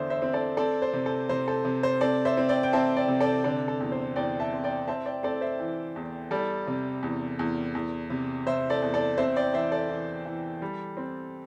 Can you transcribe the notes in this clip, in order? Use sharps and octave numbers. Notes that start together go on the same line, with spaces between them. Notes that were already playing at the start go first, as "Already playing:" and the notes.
Already playing: E2 D3 C5 D5 E5
C5 E5
C4
A4 D5
C4 A4 D5
C5
C3
A4
C3 C5
A4
C3
C5
C4 A4 D5
C5 E5
C4
D5 G5
G5
C4 E5 A5
D5 G5
C3
A4 D5
D3 A4 D5
A4
E2
C5
E2 D5 G5
E5 A5
C4
D5 G5
C4 E5 A5
D5 G5
C4 A4 D5
C5 E5
E3
E2
G3 A4 D5
C3
E2
E2
E2
C3
C3 C5 E5
A4 D5
E2
A4 D5
C4 C5 E5
D5 G5
E3 C5 E5
A4 D5
E3
E3
G3
C4